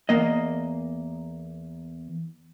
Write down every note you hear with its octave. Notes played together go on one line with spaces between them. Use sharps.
E2 A#3 D#5